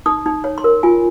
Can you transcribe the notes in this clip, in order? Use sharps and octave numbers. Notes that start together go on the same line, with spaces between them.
D#4 D#6
D#4
C#5
C6
A#4
F4 G#5